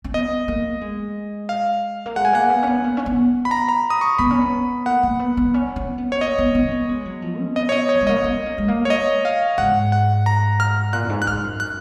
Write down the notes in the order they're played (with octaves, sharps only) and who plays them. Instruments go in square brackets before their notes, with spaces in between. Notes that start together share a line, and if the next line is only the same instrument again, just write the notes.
[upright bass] C#4
[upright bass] B3 [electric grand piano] D#5
[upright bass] A#3
G#3
[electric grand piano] F5
[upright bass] A#3
[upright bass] G#3 [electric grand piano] F#5
[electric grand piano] G#5
[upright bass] A#3 [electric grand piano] F#5
[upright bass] B3
C#4
B3
A#3
C#4
B3
[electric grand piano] B5
A#5
A#5
D#6
C#6
[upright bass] B3 [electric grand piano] B5
[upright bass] C#4
B3
[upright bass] A#3 [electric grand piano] F#5
[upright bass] A#3
B3
B3
C#4
C#4
B3
[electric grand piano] C#5
[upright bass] A#3 [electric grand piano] D#5
[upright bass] B3
C#4
B3
G#3
F#3
F3
C#4
[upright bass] B3 [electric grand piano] D#5
[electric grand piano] C#5
D#5
C#5
[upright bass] F#3
G#3
[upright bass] A#3 [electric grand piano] D#5
[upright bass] B3
C#4
A#3
G#3
A#3
[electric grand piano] C#5
D#5
F5
[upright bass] G#2 [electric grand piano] F#5
[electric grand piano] F#5
A#5
F6
[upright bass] A#2 [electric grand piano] F#6
[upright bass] F#2
G#2
[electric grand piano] F#6
[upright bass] G#2 [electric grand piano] F6
[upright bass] F#2
[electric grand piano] F#6